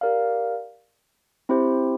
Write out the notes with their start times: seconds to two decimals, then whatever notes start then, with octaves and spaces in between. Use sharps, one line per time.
0.01 G4 A#4 D5 F5
1.49 C4 E4 G4 C5